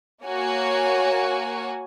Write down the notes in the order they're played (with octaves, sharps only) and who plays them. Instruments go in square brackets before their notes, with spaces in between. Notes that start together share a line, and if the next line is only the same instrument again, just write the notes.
[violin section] A#3 F#4 C#5 G#5